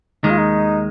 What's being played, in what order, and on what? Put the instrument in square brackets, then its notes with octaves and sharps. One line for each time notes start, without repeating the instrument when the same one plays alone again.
[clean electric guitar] D#2 D#3 G#3 [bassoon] D#4
[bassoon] F4
D#4